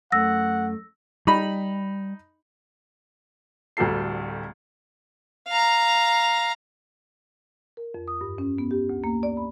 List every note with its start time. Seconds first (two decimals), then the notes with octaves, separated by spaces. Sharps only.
0.12 F#2 A3 F#5 E6 A#6
1.27 G3 D#4 B5
3.77 D1 D2 G3 F#4 A4 C7
5.48 F5 A#5
7.77 A#4
7.94 F2
8.08 D#6
8.21 G2
8.38 C#4
8.58 B3
8.71 G4
8.89 D2
9.04 A#3
9.23 D5
9.37 B5